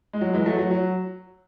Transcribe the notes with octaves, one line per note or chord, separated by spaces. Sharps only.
G#3
F#3
E3 G#3
F#3 A3
F#3
F#3